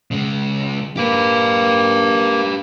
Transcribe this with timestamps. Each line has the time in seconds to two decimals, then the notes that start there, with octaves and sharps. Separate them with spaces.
0.11 C#3 G#3
0.97 A#3 G4 B4